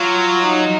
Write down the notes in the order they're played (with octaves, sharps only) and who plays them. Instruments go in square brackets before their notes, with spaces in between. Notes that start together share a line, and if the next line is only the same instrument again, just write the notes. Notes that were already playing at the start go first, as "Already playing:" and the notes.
Already playing: [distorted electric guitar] F#3 [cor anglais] F4
[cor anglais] D#4